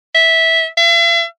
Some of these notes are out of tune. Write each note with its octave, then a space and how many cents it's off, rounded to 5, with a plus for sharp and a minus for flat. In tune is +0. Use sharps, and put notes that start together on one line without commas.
E5 -10
E5 +45